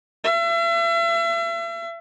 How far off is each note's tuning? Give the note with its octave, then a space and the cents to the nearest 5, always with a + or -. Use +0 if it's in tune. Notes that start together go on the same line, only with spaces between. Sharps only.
E5 +40